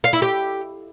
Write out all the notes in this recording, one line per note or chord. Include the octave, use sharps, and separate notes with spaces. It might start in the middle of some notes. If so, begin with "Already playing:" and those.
F5
E4
G4